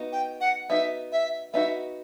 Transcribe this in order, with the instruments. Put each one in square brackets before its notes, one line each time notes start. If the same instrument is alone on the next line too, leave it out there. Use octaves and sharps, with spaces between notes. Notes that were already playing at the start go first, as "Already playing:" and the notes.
Already playing: [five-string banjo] B3 D#4 F#4
[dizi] G5
F#5
[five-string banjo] B3 D#4 F#4 [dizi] E5
[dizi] E5
[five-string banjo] B3 D#4 F#4 [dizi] E5